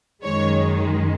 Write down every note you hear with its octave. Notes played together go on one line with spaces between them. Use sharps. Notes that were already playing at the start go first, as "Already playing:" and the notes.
F#2 D#3 G#3 C#5